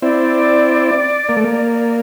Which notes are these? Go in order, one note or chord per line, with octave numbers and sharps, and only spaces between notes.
C4 E4 D5
A#3
A3
A#3